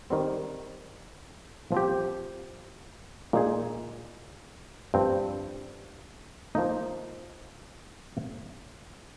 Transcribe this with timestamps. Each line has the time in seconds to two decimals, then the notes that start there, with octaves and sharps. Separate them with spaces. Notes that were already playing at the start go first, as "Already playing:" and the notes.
0.10 D#3 G3 C4
1.72 F3 C4 G4
3.33 A#2 G#3 D#4 G#4
4.94 G2 F3 C4
6.55 F3 A#3 D#4